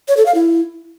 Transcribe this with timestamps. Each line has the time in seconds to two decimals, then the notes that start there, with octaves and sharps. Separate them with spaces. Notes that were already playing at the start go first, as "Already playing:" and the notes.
0.08 C#5
0.17 A4
0.26 F5
0.35 E4